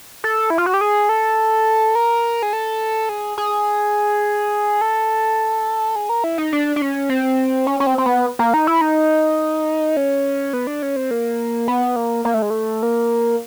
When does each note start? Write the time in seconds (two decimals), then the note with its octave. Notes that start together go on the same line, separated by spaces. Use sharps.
0.24 A4
0.50 E4
0.58 F4
0.66 F#4
0.74 G4
0.81 G#4
1.09 A4
1.95 A#4
2.43 G#4
2.53 A4
3.09 G#4
3.38 G#4
4.81 A4
5.96 G#4
6.09 A#4
6.24 E4
6.38 D#4
6.53 D4
6.76 D4
6.82 C#4
7.09 C4
7.67 C#4
7.80 C#4
7.87 C4
7.98 C4
8.06 B3
8.39 A#3
8.54 D#4
8.67 E4
8.81 D#4
9.97 C#4
10.53 B3
10.67 D4
10.83 C#4
10.96 C4
11.11 A#3
11.68 B3
11.96 A#3
12.25 A#3
12.34 A3
12.42 G#3
12.50 A3
12.83 A#3